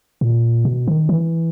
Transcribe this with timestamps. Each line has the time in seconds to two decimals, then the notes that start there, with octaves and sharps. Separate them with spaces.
0.21 A#2
0.65 B2
0.88 D#3
1.09 E3